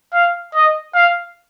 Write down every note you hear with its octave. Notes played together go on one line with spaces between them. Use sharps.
F5
D#5
F5